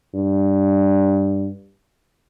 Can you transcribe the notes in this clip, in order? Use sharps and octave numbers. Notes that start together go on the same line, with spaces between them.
G2